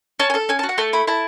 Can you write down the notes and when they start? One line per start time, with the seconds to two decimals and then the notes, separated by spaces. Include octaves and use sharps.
0.20 C#4 A5
0.30 G#5
0.34 A4 A5
0.49 C#4 G#5
0.59 A5
0.63 F#4
0.69 F#5
0.78 A3 A5
0.93 E4 B5
1.07 E4 A5